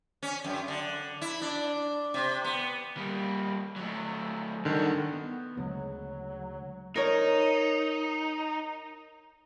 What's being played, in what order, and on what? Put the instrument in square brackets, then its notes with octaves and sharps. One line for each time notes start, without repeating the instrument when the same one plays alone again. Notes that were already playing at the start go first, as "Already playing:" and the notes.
[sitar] C#4
F#2
D3
E4
D4
C3
B3
[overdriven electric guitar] G3 A#3
F#3 A3
[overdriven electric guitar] G2 F#4 [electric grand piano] D3 D#3
[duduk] B3
[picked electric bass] D2 C#3 G#3 [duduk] F#3
[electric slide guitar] D#4 [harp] A#4 C#5